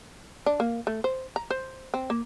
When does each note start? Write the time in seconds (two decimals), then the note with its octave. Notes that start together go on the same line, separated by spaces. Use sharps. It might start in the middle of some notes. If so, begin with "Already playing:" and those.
0.46 D4
0.60 A#3
0.87 A3
1.04 C5
1.36 A#5
1.50 C5
1.94 C4
2.10 A#3